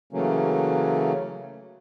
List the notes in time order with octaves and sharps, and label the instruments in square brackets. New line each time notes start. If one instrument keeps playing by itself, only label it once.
[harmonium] C#3 E3 F#3 A3 A#3 C#4